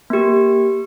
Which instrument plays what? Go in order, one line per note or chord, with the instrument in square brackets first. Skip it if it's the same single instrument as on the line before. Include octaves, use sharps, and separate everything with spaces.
[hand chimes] A#3 G4